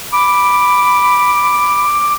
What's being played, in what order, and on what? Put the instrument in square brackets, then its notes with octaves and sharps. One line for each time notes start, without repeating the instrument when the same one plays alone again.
[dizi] B5 [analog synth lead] D6